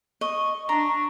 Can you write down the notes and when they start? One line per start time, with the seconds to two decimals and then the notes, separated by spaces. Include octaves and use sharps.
0.21 D#5 C#6
0.69 D4 A#5